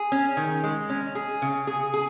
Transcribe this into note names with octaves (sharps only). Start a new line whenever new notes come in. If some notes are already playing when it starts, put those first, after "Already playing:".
Already playing: G#4
C#4
D#3
G#3
C#4
G#4
C#3
G#4
G#4